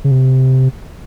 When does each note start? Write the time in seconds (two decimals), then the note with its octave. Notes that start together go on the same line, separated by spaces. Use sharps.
0.04 C#3
0.11 C3